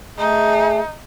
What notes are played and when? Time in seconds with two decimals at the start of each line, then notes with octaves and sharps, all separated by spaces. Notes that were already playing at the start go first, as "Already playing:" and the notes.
0.18 A3 D#4 G#4